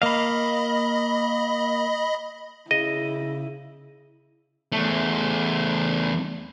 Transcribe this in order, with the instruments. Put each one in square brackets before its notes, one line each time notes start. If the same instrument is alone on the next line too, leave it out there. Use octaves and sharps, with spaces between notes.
[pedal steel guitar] A#3 F5 [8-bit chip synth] D#5 B5
[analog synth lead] C#3 [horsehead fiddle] E4 [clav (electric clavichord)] D#5
[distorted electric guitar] E2 A3